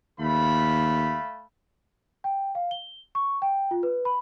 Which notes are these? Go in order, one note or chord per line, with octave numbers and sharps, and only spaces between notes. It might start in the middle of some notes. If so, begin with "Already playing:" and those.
D#2 A3 F5 B5
G5
F5
G7
C#6
G5
F4
B4
B5